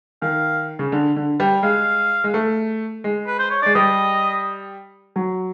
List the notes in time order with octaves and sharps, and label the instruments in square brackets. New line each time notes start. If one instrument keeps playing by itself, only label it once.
[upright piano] D#3 [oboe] F5
[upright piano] C#3
D3
D3
G3
[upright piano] G#3 [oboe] F5
[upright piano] G#3
A3
G#3
[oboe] B4
C5
C#5
[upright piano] G#3 [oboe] D5
[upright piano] G3 [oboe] D#5
[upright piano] F#3